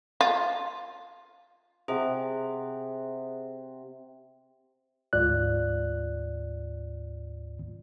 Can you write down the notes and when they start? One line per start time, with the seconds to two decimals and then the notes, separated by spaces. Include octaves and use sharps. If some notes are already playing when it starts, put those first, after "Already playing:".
0.21 F4
1.88 C3 G#4 F#5 D6
5.13 D2 G#2 F4 D5 F#6